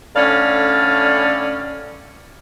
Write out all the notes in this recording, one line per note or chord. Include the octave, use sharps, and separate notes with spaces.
A2 D3 C#4 D5 F5